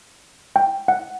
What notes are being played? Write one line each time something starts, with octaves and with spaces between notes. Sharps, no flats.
G5
F#5